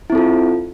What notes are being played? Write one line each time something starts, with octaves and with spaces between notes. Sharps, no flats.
C4 E4 F4 A4